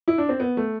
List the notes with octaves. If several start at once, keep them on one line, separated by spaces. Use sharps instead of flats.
E4
D4
C4
B3
A3